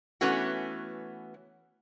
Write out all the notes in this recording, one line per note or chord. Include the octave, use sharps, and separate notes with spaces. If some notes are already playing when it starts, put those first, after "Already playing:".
E3 A3 B3 C#4 F#4